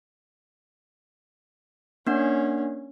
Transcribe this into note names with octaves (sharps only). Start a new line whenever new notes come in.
A#3 C#4 D4 F#5